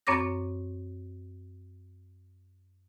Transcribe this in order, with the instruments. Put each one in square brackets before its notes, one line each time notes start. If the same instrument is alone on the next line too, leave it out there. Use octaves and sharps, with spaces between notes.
[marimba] F#2 C4 C#5 C#6 D6 A#6